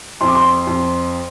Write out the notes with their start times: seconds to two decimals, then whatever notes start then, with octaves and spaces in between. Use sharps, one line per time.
0.21 F2 C6
0.28 D6
0.35 C6
0.67 F2